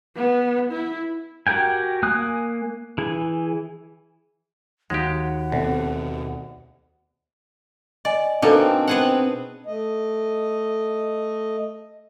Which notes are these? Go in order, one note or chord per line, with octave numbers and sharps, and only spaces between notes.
B3
E4
F#4 G4 A#4 G5 G#5
A#3 G#5 D#6 F#6
E3 G#4
D#2 G#3 F#4 G4 F#5 B6
D2 B2 C4
D5 D#5 G#5
B2 A#3 C4 D4 D#4 F#4 A4
B3 G#4 F#5
A3 D#5